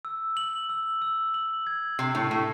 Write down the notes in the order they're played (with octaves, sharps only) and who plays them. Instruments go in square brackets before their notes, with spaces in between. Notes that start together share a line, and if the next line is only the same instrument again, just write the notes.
[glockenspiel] E6
F#7
E6
E6
F#7
G#6
[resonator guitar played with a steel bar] C3 [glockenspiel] C7
[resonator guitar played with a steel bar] A2
[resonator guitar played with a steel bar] A2 [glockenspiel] C#6